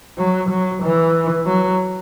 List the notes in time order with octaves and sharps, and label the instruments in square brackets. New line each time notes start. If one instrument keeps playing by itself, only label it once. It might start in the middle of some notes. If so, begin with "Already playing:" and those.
[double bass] F#3
F#3
E3
F#3